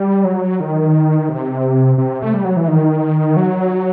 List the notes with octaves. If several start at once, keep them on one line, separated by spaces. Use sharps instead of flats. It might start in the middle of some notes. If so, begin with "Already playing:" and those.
Already playing: G3
F#3
D#3
C3
C3
A3
G3
F#3
E3
D#3
F#3